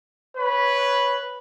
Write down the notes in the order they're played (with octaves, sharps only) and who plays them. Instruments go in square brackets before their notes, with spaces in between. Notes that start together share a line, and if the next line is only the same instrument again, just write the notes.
[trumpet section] B4 C#5 B5